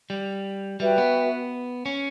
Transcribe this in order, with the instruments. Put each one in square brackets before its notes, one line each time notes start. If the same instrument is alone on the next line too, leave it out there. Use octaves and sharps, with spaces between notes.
[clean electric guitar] G3
[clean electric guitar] G3 [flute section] F#4 B4 E5 G5
[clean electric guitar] B3
C#4